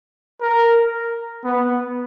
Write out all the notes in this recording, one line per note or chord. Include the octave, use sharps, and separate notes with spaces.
A#4
B3